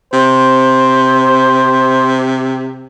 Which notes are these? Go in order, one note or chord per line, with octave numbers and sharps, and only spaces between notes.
C3 C5